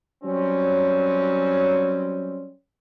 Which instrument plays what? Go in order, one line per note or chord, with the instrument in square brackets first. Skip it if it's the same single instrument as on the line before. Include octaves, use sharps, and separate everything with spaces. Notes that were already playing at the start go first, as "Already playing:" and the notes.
[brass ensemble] F#3 G3 C4 C#4